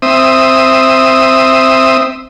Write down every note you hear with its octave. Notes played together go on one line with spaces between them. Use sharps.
C4 E5 D#6